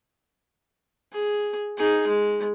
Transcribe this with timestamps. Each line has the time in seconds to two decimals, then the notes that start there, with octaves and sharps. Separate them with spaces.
1.13 G#4
1.78 D#4 G#4
2.08 G#3